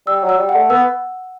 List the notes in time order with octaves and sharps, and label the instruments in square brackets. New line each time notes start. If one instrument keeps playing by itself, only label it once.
[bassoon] G3 [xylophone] E6
[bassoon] F#3
[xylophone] E6
[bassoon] G3
[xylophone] F#5
[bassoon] A3
[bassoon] B3 [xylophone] E6